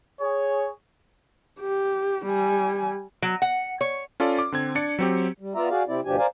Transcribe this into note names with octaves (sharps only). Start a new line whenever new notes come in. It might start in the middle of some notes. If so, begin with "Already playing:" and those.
G#4 C#5
G4
G3 G#5
F#3
F#5
C#5
C#4 F4 A4 D5
D6
D3 C4 G#6
D4 D5 C#7
F#3 C4 G4
G3
B3 F4 D5 E5 A#5
F#4 G#4 D5 F5
C3 C4 E4 D5
D2 B2 F3 D4 G4 G#5
A#4 C5 D5 F5 G#5